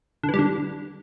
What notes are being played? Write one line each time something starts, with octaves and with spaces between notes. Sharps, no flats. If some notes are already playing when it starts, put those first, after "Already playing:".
D3
E3
G3
D3